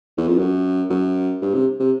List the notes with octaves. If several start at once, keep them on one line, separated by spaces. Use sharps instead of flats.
E2
F2
F#2
F#2
G2
C3
C3